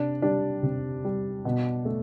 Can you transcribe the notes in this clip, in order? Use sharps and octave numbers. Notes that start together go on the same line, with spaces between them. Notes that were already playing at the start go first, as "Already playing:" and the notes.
Already playing: C3 D4
G3 D4
C3
G3
B2
A3